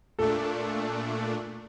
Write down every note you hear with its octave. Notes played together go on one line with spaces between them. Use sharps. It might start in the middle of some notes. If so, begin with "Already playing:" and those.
A#2 A3 D4 A4